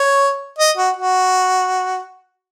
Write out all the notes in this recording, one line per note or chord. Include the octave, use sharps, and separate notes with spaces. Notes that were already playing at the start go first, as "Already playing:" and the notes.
Already playing: C#5
D#5
F#4
F#4